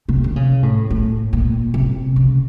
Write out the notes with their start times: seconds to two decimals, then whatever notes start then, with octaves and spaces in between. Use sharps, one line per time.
0.09 C3
0.24 D3
0.36 C#3
0.63 A2
0.90 A2
1.33 A#2
1.74 C3
2.16 C#3